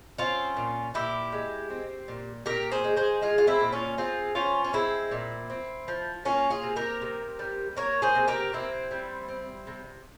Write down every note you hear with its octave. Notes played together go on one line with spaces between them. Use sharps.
C4 C#4 F4
A#2
A#2 E4 G4
G#3
C4
A#2
A#2 G4 A#4
G#4 C5
G#3
G#4 C5
G#3 F4 G#4
F4
C4 E4
A#2
C#4 F4
C4 F4 G#4
F3 C#4 F4
C#4
G#3 C4 E4
A#2
C4
F3
A#3 C#4 F4
F4 G#4
C3
G4 A#4
C3
G3
A#3 A#4 C#5
G#4 C5
C3
G4 A#4
C3 C4 E4
G3
C4
C3